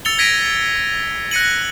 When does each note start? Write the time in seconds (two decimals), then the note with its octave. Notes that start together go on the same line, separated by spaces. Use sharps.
0.05 E6 A6 C#7 F7 G7
0.18 G#6 A#6 B6 D7 D#7
1.31 F#6 A#6 C#7 D#7 F#7